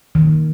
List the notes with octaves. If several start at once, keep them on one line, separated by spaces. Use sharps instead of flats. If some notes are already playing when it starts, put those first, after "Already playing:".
D#3